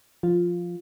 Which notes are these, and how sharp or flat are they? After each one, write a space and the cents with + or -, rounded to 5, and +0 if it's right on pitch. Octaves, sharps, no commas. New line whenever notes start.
F3 +0 F4 +0